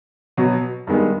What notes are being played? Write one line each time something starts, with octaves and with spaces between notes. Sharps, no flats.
B2 F#3 B3
G2 D#3 G#3 B3